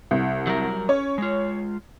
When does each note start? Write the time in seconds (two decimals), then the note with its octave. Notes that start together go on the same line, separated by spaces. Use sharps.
0.11 C2
0.47 F#3 G3 A#4
0.89 C#4 C#5
1.18 G#3 F4